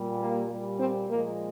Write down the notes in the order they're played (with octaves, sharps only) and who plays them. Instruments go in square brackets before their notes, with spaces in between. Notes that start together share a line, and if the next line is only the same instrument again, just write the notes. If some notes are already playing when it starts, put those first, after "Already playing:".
Already playing: [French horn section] A#2 G3
A#3
A#2 G3
C4
A#2 F3 G#3 A#3